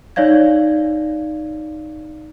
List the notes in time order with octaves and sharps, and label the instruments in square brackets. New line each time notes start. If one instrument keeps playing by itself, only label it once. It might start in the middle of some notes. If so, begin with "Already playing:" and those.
[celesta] D#4 C#5 D5 F5 G#6